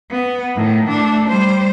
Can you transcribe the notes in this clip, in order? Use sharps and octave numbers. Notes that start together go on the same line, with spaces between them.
B3
A2 D#3
A3 D4
G3 C5